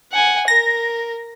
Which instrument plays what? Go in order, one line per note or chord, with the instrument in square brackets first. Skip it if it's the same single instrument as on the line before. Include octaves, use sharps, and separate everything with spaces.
[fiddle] F#5 G#5
[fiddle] A#4 [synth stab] A#6